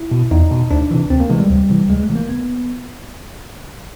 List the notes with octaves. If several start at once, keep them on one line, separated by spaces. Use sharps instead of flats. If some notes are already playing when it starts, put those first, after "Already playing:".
Already playing: E4
B2
E2 D#4
B2
D2 D4
C3 E3
D2 C4
A#3
C3 E3 G#3
G3
D2
C3 E3
D2 G#3
A3
C3 E3
A#3
B3